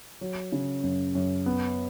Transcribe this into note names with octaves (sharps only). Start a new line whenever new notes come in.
F#3
C#3
F#2
F#2
B3